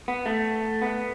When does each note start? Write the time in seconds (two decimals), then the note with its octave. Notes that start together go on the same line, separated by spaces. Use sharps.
0.08 B3
0.26 A3
0.82 B3